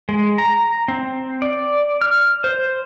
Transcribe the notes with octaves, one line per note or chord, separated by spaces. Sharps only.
G#3
A#5
C4
D5
F6
C5